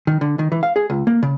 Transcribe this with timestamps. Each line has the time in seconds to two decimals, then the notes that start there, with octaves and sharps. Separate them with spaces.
0.07 D#3
0.21 D3
0.39 D#3
0.52 E3
0.63 F5
0.76 G#4
0.90 C#2
1.07 A#3
1.23 C#3